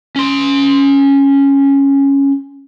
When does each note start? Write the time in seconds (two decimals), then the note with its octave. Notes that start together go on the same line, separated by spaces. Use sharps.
0.16 C#4 C6